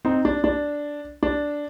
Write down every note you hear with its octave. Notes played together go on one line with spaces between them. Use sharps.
C4 D#4
D4
D4
D4